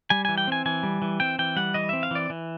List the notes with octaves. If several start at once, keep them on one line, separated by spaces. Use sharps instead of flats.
G3 G#5
E3 G#5
G5
C4 G#5
E3 G#5
G3
E3
C4 G5
E3 G5
G3 F#5
E3 D#5
C4 E5
F5
E3 D5
E3